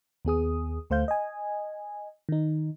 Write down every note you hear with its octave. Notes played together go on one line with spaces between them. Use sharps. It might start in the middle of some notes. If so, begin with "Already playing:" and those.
D#2 B3 G#4 D#6
D2 A3 C5 F5 G6
D#5 G#5
D#3 D#4